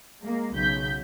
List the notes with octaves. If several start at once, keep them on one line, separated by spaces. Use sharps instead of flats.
G#3 A#3
B1 C#3 G6 B6